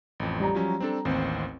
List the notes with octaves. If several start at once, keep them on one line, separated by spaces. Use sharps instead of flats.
A1 F2
G3 A#5
F3 F#3 C#4
C4 D4 A4
A1 D#2 C4 C5